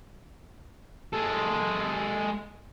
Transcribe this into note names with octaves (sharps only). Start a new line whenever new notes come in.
G#3 A4